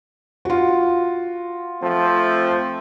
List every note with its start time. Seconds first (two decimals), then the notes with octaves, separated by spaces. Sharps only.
0.45 F4 F#4
1.81 F3 A3 C4